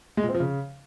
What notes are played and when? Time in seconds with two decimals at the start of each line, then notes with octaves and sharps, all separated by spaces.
0.17 G#3
0.23 A#2
0.29 C4
0.34 F3
0.40 C#3